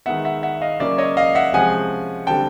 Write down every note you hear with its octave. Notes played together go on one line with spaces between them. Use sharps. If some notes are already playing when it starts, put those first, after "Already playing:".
D#3 G#3 B3 E5 F#5
E5 F#5
E5 F#5
D#5 F5
C#3 F#3 A#3 C#4 D5 E5
C#5 D#5
D#5 F5
E5 F#5
C3 F3 G#3 C#4 F#5 G#5
D3 G3 C4 G5 A5